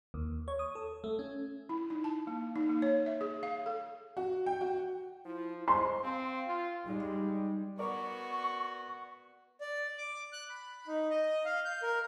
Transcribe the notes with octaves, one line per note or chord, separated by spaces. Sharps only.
D#2
C#5
D#6
A4
A3
C#4
E4
D#4
A5
A#3
D#4
A#3
C#5
E5
G#4
F5
A4
F#4
G5
F#4
F3 E4
G#3 C5 C6
C4 F5
F4
G3 G#3 D#4
B3 F#4 A#4 D5 C#6
D5
D6
F#6
B5
D#4
D#5
F5
G6
A#4